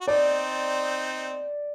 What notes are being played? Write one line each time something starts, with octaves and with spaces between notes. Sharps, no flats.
F#4
C4 D#4 D5